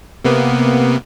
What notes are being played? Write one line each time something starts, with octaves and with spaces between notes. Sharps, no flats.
C3 A#3 B3